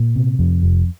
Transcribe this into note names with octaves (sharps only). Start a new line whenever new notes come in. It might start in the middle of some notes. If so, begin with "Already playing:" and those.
Already playing: A#2
C3
F2
F1